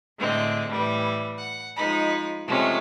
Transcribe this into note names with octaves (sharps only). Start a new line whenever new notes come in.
A2 D3 G#3 C4
A2 E3 G3
F#5
F3 G#3 D#4 B5
C3 F3 G#3 A3 C#4